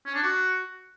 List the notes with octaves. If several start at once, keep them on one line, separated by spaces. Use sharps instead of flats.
C#4
D4
F#4